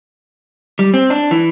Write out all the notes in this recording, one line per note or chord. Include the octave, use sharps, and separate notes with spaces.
G3
C4
D4
E3